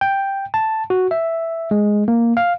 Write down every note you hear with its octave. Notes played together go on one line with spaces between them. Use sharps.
G5
A5
F#4
E5
G#3
A#3
F5